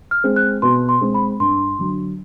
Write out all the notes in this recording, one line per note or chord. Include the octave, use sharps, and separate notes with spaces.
F6
G#3 C4
F#6
B2 C6
C6
G#3 C4
B5
G2 C6
D3 F#3